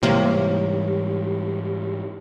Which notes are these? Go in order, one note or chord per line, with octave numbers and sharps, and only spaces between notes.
G#2 C3 E3 G3 A#3 E4 G4 C#5